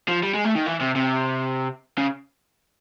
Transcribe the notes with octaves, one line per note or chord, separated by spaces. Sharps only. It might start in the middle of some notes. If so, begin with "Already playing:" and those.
F3
G3
G#3
A3
D#3
E3
C3
C3
C#3